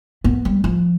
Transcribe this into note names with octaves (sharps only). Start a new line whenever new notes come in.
B3
G3
F3